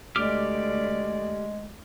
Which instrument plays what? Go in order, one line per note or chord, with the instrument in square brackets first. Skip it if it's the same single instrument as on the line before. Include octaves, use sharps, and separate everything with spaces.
[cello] D2 D5 [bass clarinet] G#3 [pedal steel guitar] G4 D6 F6